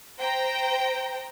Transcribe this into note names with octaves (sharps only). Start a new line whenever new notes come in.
C5 G5 A#5